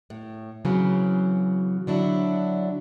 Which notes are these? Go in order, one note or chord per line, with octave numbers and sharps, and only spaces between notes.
A2
C#3 E3 F#3 C4
D3 F#3 D4 E4